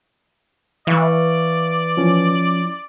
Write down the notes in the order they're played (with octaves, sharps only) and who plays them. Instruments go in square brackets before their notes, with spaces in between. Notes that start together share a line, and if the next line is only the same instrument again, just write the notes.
[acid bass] E3 [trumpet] D5 [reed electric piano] E5 F5 C#6
[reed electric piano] F3 C#4 E4